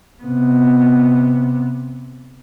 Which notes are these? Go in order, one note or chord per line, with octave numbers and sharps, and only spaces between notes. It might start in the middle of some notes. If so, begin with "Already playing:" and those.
C3 B3